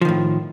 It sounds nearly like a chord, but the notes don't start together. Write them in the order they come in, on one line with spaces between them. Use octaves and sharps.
F3 D#3 A2